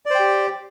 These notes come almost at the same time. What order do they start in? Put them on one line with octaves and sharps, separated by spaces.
D5 C5 G5 G4